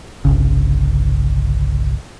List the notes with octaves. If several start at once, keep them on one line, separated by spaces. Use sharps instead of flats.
G1 C2 C#3